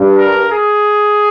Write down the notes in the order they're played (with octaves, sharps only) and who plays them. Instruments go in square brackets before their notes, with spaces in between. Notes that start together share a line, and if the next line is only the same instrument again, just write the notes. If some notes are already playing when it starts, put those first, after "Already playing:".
Already playing: [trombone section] G2
[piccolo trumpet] A#4
G#4